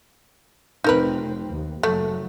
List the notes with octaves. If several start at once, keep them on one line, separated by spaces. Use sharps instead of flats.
F1 C4 D#4 A#4 B4
D#2
F#1 F#3 A3